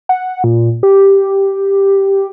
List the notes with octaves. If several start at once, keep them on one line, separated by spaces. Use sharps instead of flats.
F#5
A#2
G4